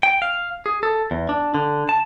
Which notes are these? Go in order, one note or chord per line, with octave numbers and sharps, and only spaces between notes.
G5
F5
G#4
A4
E2
D4
D3
A5